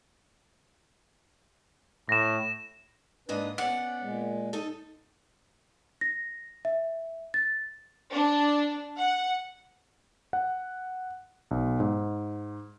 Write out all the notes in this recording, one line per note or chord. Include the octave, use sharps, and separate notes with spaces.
A2 A#6 E7
G#2 A#3 D4 B4 D#5
B3 C#4 D5 F#5
A#2 G#3
D#4 A4
A#6
E5
A6
D4
F#5
F#5
B1
G#2